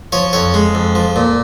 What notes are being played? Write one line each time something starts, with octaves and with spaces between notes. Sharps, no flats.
F3 C#5
F2 C#5
G#3
F2
F3
A#2